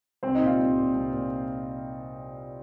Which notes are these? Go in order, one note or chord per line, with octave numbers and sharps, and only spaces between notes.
C2 C4 C5
D#4 D#5
A#2
F4 F5
C2
A#2
C2
A#2